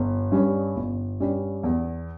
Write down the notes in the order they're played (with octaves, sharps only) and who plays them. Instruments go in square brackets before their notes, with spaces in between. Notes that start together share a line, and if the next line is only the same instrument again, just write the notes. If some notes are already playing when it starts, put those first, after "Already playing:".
Already playing: [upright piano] G1
G2 G3 C#4
G1
G2 G3 C#4
E2